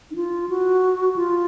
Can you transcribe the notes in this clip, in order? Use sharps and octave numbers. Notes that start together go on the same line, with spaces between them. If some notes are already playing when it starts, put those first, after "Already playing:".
D#4
F4
F#4
F4